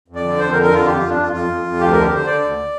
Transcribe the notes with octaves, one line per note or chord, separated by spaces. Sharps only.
F2
D5
D3
F2 C5
A#4
D3
A#4
F2 F4
F2 G4
F2 F4
D4
F2 F4
F2 F4
F2
F2
D2 G4
D3 A#4
G4
D3 C5
D3 D5
D2